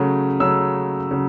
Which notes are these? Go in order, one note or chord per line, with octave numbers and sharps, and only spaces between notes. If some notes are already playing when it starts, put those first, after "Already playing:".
Already playing: C#3 F#3 A3
C#3 F#3 A3 E6
C#3 F#3